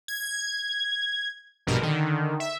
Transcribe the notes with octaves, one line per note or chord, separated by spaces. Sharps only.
G#6
A#1 G2 B2 A#4
D3 D#3
E5